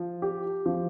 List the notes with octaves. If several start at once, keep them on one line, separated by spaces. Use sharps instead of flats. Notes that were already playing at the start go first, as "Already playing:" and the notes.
Already playing: F3
G4
F3